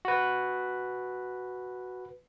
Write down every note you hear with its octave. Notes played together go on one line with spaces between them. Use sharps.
F#4 B4